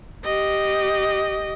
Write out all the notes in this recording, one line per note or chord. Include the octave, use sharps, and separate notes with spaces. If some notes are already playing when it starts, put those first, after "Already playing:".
G4 D#5